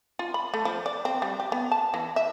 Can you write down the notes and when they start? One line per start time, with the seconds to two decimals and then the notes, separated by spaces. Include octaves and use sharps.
0.19 F4
0.34 B5
0.54 A3
0.65 F3
0.86 D5
1.05 C4
1.22 G3
1.40 G4
1.52 B3
1.72 A5
1.94 E3
2.16 E5